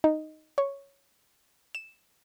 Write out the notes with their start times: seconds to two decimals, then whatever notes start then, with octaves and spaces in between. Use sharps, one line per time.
0.04 D#4
0.58 C#5
1.75 E7